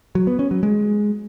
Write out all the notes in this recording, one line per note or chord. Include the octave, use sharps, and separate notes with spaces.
F#3
B3
C#4
F#3
G#3